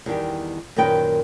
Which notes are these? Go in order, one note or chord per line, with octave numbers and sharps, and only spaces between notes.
E2 D#3 G3 G4
F#2 A#2 D#3 A#4 B4 G5